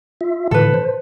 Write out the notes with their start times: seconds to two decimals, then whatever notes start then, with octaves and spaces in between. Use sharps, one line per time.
0.21 F4 E5
0.51 A2 D3 E3 A4 B4
0.74 C5